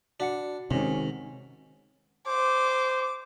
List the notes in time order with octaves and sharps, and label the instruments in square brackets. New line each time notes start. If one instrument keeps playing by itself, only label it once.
[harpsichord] D4 [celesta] F#4 F#5 C#7
[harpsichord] G#2 [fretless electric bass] C3 D#3 [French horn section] C#4
[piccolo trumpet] C5 [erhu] D6